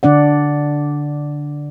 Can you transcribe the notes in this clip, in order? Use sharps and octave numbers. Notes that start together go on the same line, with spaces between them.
D3 D4 D5 F#5